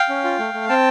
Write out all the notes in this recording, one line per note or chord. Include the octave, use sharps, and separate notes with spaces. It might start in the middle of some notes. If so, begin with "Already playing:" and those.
Already playing: F5 G5
C#4
F4
A3
A3
C4 G5 A5